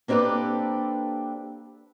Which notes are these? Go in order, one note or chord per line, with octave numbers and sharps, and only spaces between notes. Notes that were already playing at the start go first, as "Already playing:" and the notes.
A#3 C4 D4 G4 A4 B4